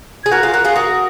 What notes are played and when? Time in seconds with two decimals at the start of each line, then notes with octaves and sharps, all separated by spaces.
0.24 G#4 G#6
0.31 F#4 A#4 F#6
0.43 F4 G#4
0.53 F#4 A#4 F#6
0.65 F4 G#4
0.76 F#4 A#4 D#6